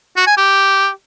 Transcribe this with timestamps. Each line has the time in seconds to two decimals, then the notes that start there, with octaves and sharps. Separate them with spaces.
0.16 F#4
0.27 G#5
0.37 G4